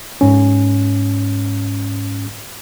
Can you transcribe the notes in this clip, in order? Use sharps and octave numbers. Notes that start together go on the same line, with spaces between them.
G#2 C#4